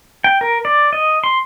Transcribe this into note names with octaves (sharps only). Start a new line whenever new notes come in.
G5
A#4
D5
D#5
C6